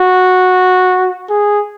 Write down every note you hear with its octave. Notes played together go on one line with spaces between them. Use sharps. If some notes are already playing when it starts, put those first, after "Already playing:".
Already playing: F#4
G#4